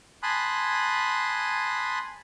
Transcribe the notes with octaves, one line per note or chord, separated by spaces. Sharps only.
G#5 A5 B5 C6 D#6 F#6